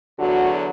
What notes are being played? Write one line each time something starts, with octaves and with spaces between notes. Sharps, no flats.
E2 D3 F#3 F#4